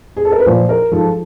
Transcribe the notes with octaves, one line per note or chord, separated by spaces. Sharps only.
G#4
A4
A#4
B4
A#2 F3 C5
A#4
G#2 F3 A4